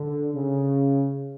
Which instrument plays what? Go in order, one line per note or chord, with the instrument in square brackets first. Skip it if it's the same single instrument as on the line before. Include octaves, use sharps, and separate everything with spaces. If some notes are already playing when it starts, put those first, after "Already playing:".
Already playing: [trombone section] D3
C#3